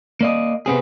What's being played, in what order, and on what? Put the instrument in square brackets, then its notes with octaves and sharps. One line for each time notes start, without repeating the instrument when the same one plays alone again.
[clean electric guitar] A#3 D5 D#5
C3 B3 C4 G#4